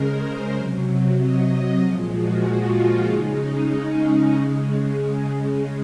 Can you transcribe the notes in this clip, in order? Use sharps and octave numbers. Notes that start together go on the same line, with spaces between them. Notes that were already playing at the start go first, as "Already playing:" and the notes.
Already playing: C#3 G#3 A#4 C5
C3 F#3
D#5
A#2 F3 G#3 F5
F#4
F4
C#3 G#3 D#4
C#4
C#4
C#3 G#3